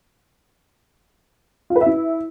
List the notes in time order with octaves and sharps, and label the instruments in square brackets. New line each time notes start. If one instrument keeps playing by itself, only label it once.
[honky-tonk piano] F4
B4
E5
E4